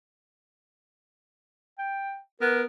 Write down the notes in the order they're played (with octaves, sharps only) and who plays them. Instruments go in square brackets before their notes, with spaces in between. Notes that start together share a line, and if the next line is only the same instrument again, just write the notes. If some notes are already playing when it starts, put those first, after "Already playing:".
[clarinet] G5
[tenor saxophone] B3 [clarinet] A#4